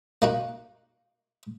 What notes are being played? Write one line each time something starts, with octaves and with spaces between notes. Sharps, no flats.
A#3 D#4 F#4